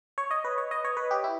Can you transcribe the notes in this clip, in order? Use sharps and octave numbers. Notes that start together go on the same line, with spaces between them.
C#5
D#5
B4
C#5
D#5
C#5
B4
G4
E4